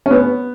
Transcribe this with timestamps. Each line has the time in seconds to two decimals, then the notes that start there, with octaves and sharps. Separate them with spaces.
0.06 C#4
0.11 B3